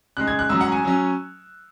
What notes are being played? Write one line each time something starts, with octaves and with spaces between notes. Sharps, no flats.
C#3 G#3 D#4 F#6
G#6
F#6
G#2 F#3 C#4 E6
F#5
G#5
F#3 C#4